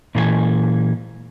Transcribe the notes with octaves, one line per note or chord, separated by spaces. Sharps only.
A#2 E3 A#4 G#5